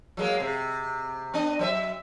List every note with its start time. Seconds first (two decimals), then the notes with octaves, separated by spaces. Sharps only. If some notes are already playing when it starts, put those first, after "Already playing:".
0.17 F#3 G#3 A#3
0.40 C3
1.34 B3 D4 D#5
1.59 F#3 C#5 E5